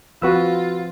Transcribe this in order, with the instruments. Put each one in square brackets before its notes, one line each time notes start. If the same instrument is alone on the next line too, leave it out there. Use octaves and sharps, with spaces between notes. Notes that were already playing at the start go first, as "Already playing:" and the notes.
[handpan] F3 C4 [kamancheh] F4 [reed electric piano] F#4 B4 E6